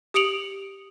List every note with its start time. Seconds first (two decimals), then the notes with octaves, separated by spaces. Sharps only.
0.14 G4 D#6 C#7 D7 F7 F#7